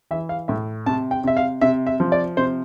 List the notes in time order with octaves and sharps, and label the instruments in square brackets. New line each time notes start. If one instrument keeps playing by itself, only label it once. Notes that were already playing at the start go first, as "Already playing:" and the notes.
[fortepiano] E3 E5
F5
A2 E5
C3 A5
G5
C3 E5
F5
C3 E5
E5
F3
D5
C3 C5